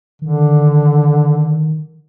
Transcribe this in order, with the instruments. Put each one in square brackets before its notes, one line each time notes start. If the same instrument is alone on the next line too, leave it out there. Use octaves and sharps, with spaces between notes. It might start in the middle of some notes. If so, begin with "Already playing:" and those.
[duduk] D3 [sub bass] D#3